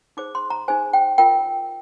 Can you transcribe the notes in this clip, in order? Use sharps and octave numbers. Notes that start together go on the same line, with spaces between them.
D#4 G#4 C5 D6
C6
A#5
D#4 G#4 C5 G#5
G5
F4 A#4 G5